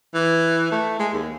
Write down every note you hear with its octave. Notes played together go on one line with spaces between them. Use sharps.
E3
A3
G#3
D#2